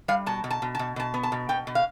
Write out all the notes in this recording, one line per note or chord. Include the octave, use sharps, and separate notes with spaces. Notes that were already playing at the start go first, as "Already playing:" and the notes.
G3 F5
B2 A5
B2
A5
B2
B2 A5
B2 A5
B3
A5
B2
B2 G5
B2
F5